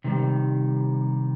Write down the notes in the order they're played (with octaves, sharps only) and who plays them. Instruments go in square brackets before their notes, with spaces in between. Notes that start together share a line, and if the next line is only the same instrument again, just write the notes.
[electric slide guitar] C3 D#3 G3